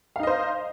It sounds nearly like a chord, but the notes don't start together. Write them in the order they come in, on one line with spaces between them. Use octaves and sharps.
F5 D#4 D#5 C5